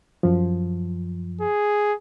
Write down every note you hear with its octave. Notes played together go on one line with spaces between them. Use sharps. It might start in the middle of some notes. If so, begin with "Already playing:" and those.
F#2 F3
G#4